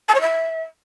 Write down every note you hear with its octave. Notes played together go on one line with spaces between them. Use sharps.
A5
C#5
E5